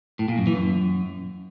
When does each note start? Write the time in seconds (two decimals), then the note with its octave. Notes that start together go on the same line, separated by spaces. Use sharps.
0.19 A2
0.28 A#2
0.38 F#2
0.47 E3
0.56 F#2